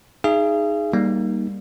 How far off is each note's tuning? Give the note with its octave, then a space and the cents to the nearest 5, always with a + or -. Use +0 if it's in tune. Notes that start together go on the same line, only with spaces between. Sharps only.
D#4 +0 G#4 +0 F5 -45
G3 +0 A#3 +15 D#4 +0